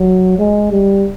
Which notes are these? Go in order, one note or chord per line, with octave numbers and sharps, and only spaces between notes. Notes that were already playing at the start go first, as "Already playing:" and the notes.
Already playing: F#3
G#3
G3